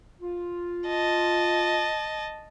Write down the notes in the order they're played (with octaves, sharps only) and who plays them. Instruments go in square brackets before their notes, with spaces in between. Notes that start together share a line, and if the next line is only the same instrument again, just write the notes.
[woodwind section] F4
[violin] D#5 A5